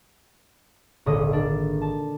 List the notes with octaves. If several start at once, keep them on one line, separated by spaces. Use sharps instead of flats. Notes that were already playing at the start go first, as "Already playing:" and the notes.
D#1 G#1 D3 D#5 D#6
D4
A5